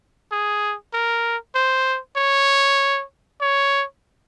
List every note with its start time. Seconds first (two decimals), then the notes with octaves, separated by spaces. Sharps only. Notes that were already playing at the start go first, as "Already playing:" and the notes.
0.32 G#4
0.93 A#4
1.55 C5
2.16 C#5
3.41 C#5